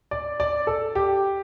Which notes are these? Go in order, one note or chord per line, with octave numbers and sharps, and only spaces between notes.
D5
D5
A4
G4